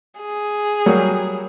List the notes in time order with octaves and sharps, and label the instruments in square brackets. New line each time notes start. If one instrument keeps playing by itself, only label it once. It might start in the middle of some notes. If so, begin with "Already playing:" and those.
[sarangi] G#4
[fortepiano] F#3 G3 A#3